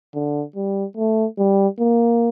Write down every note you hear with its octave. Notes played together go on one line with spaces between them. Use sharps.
D3
G3
A3
G3
A#3